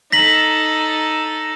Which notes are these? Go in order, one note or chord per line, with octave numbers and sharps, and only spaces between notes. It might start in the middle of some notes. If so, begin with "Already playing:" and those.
D#4 A4 A#6 B6 F#7